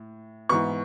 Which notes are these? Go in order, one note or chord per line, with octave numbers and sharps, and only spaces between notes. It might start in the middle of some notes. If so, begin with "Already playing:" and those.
Already playing: A2
G#2 E3 B3 C#6